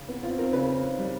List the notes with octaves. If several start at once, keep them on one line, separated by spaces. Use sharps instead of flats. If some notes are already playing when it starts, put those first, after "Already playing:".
Already playing: C#3
B3
C4 F4
C4 A#4
C#3 B4
C4
C#3
G3